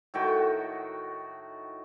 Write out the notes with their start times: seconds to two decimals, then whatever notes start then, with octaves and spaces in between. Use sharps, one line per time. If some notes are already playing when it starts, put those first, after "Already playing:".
0.14 A2 D#3 F#4 G5